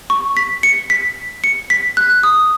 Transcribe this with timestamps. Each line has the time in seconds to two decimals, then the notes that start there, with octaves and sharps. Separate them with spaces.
0.10 C#6
0.37 B6
0.63 C#7
0.90 B6
1.44 C#7
1.70 B6
1.97 F#6
2.23 D#6